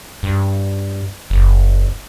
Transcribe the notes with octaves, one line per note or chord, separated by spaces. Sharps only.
G2
F#1